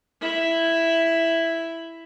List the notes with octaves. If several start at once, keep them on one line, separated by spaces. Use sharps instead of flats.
E4 E5